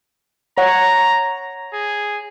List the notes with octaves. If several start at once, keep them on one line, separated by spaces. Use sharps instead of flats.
C#5 F#5 A#5
G#4